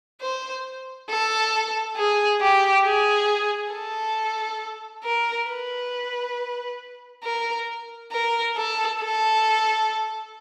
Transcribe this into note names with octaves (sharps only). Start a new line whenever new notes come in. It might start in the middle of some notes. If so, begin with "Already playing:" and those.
C5
A4
G#4
G4
G#4
A4
A#4
B4
A#4
A#4
A4
A4